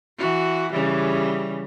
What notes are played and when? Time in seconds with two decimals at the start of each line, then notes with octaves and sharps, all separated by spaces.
0.18 E3 F#4
0.72 C#3 E3 G3